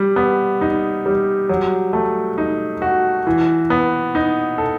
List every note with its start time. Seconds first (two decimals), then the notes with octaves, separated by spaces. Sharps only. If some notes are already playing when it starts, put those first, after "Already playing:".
Already playing: G3
0.16 B3
0.61 D#4
1.06 G3
1.49 F#3
1.93 A3
2.38 D#4
2.82 F#4
3.27 E3
3.70 B3
4.15 D#4
4.58 A4